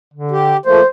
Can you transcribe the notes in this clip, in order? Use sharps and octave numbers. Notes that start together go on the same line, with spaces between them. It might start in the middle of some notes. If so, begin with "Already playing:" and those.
D3
G4
F3 A3 A#3 C5